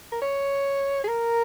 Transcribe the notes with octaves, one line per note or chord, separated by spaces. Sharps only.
A#4
C#5
G#4
A#4